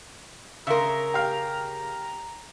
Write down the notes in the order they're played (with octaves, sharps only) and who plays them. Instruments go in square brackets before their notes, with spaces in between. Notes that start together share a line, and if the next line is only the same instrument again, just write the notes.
[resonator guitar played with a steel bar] C#3 A#4 [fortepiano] E5 C6 [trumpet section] A#5
[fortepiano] G4 F5